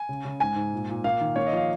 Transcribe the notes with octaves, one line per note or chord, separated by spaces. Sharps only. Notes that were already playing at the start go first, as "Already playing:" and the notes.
Already playing: G#5
C#3
C#3
G#2 G#5
G#2
A#2
A#2
A#3 F5
D#3
A#3 C#5
D#5
F3 F5